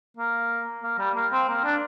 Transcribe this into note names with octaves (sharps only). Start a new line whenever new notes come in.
A#3
A#3
G3
A#3
C4
A#3
D4